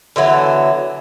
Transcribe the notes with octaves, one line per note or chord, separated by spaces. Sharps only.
D3 E3 F#3 B3